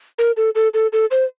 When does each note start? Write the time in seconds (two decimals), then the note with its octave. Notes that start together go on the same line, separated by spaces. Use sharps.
0.19 A#4
0.37 A4
0.55 A4
0.74 A4
0.93 A4
1.11 C5